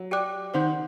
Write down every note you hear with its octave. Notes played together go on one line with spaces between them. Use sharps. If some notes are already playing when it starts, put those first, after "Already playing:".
Already playing: F#3
G4 D5 G5 D6 F#6
D#3 C5 F#5 C6 G6